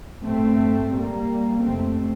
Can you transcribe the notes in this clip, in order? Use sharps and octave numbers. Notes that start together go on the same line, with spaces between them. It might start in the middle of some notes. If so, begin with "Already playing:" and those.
G2 A3 C4
G3 A#3
F2 C3 A3 C4